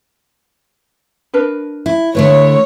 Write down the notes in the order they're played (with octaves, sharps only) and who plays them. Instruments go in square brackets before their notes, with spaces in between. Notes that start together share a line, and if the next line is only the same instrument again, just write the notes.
[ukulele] D4 A#4 B4
[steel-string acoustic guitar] E4
[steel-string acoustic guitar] D3 A3 E4 [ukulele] B4 [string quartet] C#5